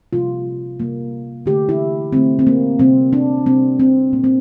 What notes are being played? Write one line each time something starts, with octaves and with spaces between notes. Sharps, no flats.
C3 G3 A#3 F4
C3 G3 A#3
D3 A3 G4
E4
D3 A3 C4
C4
A#3
C3 G3 A#3 C4
D4
C3 G3 A#3 C4
C4
A#2 G3 A#3
C4